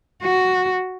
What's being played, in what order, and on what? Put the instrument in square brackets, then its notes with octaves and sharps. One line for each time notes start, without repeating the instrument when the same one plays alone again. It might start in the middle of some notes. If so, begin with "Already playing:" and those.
[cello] F#4